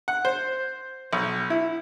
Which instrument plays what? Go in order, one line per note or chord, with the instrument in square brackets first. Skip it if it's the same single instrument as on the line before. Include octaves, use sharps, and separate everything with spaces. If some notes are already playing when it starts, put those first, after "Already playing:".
[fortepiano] F#5
C5
B1
E4